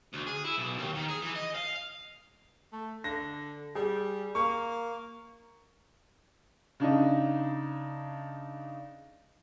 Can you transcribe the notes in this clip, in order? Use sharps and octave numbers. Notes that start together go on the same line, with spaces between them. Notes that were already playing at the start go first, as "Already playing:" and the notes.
D2
G#4
E4
B1
D#2
D#3
G#4
E3
D#5
F5
A3
D3 A#6
G3 G#4
A#3 C#6
C#3 D4 D#4